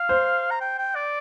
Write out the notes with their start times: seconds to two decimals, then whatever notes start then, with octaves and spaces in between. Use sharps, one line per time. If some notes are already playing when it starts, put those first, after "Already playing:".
Already playing: F5
0.09 C5
0.51 A#5
0.60 G5
0.78 G5
0.95 D5